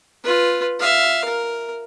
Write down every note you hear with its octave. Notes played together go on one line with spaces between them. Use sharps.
F4 B4
E5 F5
A#4